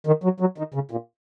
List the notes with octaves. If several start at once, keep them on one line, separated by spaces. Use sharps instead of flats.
D#3
F#3
F#3
D#3
C#3
A#2